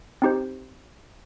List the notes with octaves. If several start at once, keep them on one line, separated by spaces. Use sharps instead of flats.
C4 D#4 G4 C5